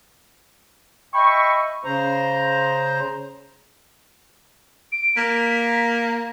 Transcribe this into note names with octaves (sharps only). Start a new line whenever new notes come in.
D#5 E5 G5 B5 C#6
C#3 C5 A#5
D7
A#3 B6